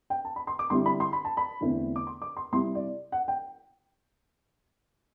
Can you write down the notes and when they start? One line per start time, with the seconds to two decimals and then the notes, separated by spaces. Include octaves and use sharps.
0.10 G5
0.25 A5
0.36 B5
0.47 C6
0.59 D6
0.70 D3 G3 C4 E4 C6
0.86 B5
1.00 C6
1.13 B5
1.25 A5
1.37 B5
1.61 E2 D3 A3 C4 E4
1.96 D6
2.07 C6
2.22 D6
2.37 C6
2.52 C3 G3 C4 E4 C6
2.75 D5
3.12 F#5
3.28 G5